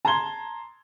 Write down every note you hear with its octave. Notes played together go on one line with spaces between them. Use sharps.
A5 A#5 C6 G#6 G7